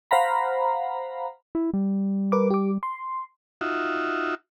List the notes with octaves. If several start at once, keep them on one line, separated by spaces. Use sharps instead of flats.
C5 F5 F#5 A#5 B5
E4
G3
A#4 B4 D6
G4 D6
C6
D#4 F4 F#4 E5